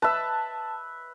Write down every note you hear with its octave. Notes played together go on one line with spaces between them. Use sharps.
B4 E5 A5